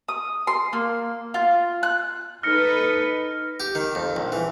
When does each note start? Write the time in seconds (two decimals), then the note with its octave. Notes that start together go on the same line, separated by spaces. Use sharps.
0.08 D#6
0.47 C6
0.73 A#3
1.34 F4
1.83 F#6
2.43 D#4 A4 B4 F6 A#6 C#7
3.60 G4
3.75 D#3
3.95 F2
4.16 A#1
4.32 E3